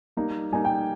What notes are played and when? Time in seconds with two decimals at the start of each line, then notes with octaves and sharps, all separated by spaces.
0.17 G3 A#3 D#4
0.52 G3 A#3 D#4 G#5
0.65 G5